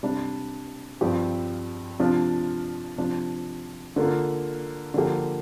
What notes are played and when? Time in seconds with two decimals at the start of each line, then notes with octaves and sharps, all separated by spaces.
0.03 C3 G3 D4
1.01 G2 F3 C4 G4
1.99 C3 F3 D4 F4
2.97 C3 F3 D4
3.96 D3 A#3 F4
4.94 D3 F3 A#3 G4